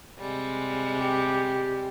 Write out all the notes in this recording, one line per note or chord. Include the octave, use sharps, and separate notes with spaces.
C3 G3 G#3
G4